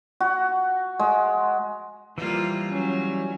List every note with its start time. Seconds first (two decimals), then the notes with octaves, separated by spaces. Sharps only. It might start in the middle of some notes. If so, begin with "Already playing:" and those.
0.20 F#4
0.99 G#3
2.18 E3 F3 G3 A#3 F4
2.71 F#3 C#4